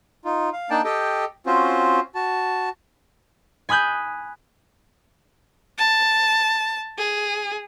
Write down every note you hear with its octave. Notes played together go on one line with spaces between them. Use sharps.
D#4 F4
F5
A#3 D4 D#4 D5 G5 A5
G4 A4 D#5 G5
C4 C#4 F4 F#4 C5
F#4 A5
G#5 B5 D#6 F#6 G6
A5
G#4